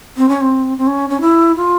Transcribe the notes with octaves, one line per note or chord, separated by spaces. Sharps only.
C4
C#4
C4
C4
C#4
C#4
E4
F4